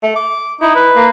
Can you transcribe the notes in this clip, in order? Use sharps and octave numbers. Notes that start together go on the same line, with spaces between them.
A3
D6
D#4 E4
B4
A#3